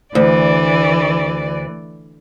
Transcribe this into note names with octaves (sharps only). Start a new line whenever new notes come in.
D2 E3 D5